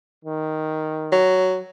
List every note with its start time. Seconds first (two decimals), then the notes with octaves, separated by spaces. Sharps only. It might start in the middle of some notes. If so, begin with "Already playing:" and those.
0.21 D#3
1.11 F#3